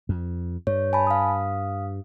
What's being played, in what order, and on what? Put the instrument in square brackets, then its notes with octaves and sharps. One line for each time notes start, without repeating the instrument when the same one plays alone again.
[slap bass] F2
[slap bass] G2 [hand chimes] C#5
[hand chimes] G#5 A5 B5
F5 D#6